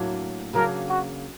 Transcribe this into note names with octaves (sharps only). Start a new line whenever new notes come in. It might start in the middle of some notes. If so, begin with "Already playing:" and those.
Already playing: A2 F#3 A#3 D4
C#3 F#3 A#3 D4 A#4
F#4